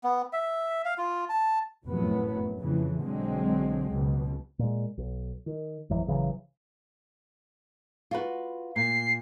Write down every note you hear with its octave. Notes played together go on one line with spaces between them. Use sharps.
B3
E5
F5
F4
A5
F1 F#2 A2 F#3 B3
F2 C#3 E3
B1 D3 F#3 G#3 C4
C#2 B2
A#2 G#3
B1
D#3
G#1 F2 E3 F#3
G#1 C#3 E3 F#3
F4 F#4 B4
A#2 C7